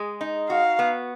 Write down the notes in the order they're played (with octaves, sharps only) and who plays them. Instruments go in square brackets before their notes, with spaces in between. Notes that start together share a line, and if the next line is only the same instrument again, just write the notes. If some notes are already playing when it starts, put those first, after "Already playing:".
Already playing: [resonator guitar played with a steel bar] G#3 G#4
D#4
[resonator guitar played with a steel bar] F#4 [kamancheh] F5
[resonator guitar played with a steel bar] B3